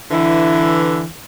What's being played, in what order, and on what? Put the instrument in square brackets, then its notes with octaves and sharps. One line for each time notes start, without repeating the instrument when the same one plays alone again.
[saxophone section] D3 E3